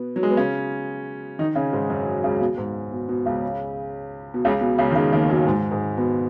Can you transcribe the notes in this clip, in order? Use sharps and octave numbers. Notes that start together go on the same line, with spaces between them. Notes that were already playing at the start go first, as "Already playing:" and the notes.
Already playing: B2 B3
F#3
G#3
B3
C#3 C#4
D#3 D#4
C#3 C#4
G#2 G#3
F#2 F#3
C#2 C#3
B2
G#2
B2
B2
C#2 C#3
B2
C#2 C#3
B2
C#2 C#3
D#3
C#2 C#3
D#2 D#3
F#2 F#3
G#2 G#3
G#2 G#3
B2 B3